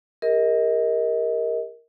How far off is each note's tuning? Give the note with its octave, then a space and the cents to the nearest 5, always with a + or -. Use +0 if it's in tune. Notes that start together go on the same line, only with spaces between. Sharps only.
G4 +45 A#4 +0 D#5 +30